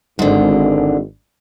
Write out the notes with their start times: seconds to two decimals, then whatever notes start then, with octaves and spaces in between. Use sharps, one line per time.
0.19 G#1 G#2 D3